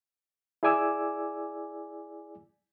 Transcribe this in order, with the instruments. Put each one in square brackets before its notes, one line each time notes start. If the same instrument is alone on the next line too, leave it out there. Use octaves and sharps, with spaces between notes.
[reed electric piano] E4 G#4 D5 G#5 D6 E6